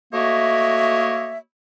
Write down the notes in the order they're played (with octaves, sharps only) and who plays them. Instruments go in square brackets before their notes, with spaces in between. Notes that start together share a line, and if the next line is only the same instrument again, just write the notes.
[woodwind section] A3 A#3 F#4 C#5 D#5 E5